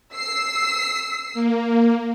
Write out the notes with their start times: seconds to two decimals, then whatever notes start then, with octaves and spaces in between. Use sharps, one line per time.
0.15 E6 C7
1.34 A#3